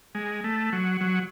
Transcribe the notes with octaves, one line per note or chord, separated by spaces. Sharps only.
G#3
A3
F#3
F#3